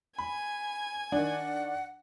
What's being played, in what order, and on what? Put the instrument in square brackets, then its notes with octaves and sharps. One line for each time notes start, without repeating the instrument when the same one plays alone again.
[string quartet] G#5 G#6 [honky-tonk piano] B5
[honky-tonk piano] D#3 D4 [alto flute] F#5